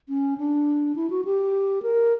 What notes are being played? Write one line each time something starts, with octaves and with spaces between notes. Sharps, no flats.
C#4
D4
E4
F#4
G4
A#4